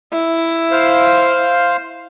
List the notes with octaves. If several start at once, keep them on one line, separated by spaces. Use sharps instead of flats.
E4
C5 F5